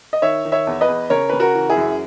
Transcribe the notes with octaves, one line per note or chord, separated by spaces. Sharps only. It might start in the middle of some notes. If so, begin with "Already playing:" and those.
D#5
D#3 C#5 E5
D#3
C#5 E5
E2
B4 D#5
E2
C#3 A#4 C#5
C#3 B4
F#4 A#4
E3
E4 G#4
F#2